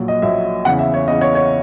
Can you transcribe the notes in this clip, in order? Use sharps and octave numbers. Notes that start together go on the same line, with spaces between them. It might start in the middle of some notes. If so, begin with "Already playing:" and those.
Already playing: A#1 A#2 F#3
D#5
A#1 A#2 F#3 E5
E2 C#3 E3 F#5
E5
C#5
E2 C#3 E3 D#5
C#5
C#5